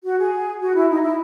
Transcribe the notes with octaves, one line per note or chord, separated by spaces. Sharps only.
F#4
G#4
F#4
E4
D#4
E4